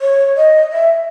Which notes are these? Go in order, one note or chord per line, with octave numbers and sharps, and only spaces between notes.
C#5
D#5
E5